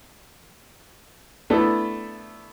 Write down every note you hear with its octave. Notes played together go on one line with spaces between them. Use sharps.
A3 B3 D4 E4 A4